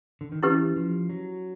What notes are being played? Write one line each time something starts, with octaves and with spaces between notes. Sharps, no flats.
D3
D#3
E3 C#4 E4 G4 B4
F3
F#3